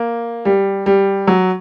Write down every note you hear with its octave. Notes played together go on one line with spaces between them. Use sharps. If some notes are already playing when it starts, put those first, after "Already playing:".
Already playing: A#3
G3
G3
F#3